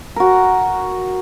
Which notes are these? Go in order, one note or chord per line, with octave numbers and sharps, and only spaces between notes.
F#4 A#4